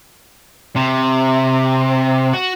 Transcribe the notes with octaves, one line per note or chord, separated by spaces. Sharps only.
C3
F#4